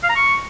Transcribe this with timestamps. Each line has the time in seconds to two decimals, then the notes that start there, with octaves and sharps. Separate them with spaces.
0.03 F5
0.09 A#5
0.16 C#6